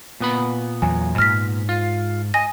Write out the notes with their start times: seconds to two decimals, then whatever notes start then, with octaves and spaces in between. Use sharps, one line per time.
0.20 A#2 B3 B5
0.82 E2 F#3 G#5
1.18 G#2 F6 A#6 B6
1.69 F4
2.34 D#5 G#5 A#6